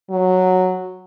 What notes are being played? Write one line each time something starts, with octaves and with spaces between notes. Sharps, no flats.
F#3